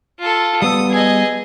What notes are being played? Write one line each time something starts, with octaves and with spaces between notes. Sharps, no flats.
F4 A4
G3 B3 D#6 E6
G#4 D#5